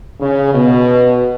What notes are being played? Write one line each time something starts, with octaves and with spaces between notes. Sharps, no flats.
C#3
B2